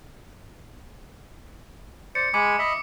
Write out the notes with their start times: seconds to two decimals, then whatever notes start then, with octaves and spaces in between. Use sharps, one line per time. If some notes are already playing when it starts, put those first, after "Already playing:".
2.15 C5 D5 C#7
2.34 G#3 G#5 B5 D6 C#7
2.59 D#5 E5 B5